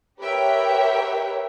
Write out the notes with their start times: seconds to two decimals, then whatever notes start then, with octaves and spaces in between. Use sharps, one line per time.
0.19 G4 A#4 B4 C#5 E5 G5